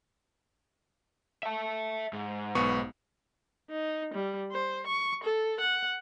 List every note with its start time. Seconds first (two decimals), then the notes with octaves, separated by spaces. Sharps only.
1.43 E5 A5
2.13 G#2
2.55 B1 B3 C#6
3.70 D#4
4.14 G3
4.52 C5
4.87 C#6
5.24 A4
5.61 F#5